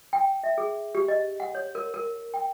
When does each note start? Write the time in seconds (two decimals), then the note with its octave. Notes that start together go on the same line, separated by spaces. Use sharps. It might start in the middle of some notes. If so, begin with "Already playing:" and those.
0.13 G5
0.44 E5
0.58 G#4
0.95 G4
1.08 D#5
1.40 F#5
1.55 C#5
1.75 A#4
1.94 A#4
2.34 G5